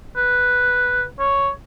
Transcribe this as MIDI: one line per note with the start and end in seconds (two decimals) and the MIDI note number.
0.16 1.03 71
1.19 1.50 73